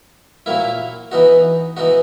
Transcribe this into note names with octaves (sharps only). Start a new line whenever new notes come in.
A#2 F#3 A#3 E4
E3 B3 D#4 F#4
E3 B3 D#4 F#4